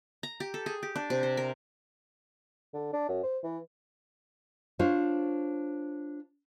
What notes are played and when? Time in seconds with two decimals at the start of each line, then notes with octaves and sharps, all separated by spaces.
0.23 A#5
0.40 G4
0.54 A4
0.66 G#4
0.83 G4
0.96 D4
1.10 C3
1.23 C5
1.37 A#4
2.74 D3
2.93 D4
3.09 F#2
3.23 C5
3.44 E3
4.79 D4 F4 C5 C#5